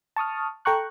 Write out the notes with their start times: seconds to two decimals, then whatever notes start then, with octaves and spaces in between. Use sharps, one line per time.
0.16 A5 C#6 D#6 F6
0.65 A4 G5 A#5 C#6 F#6